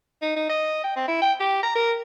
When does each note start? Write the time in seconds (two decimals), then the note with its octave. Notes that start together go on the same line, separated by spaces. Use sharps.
0.22 D#4
0.36 D#4
0.49 D#5
0.84 G5
0.96 C4
1.08 E4
1.22 G5
1.40 G4
1.63 A#5
1.75 A#4